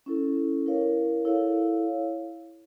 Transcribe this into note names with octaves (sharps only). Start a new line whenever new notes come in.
C#4 E4 A4
E4 A#4 C#5 F5
E4 A4 C#5 F5